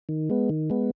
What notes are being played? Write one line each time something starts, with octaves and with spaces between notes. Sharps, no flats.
D#3
G#3 B3
D#3
G#3 B3